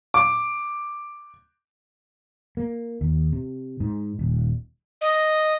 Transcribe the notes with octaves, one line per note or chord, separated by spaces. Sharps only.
D6
A#3
D#2
C3
G#2
D#1
D#5